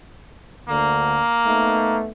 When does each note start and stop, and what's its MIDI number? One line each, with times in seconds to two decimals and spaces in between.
0.69 1.19 38
0.69 1.19 50
0.69 1.97 58
1.46 2.09 57
1.46 2.09 59
1.46 2.09 63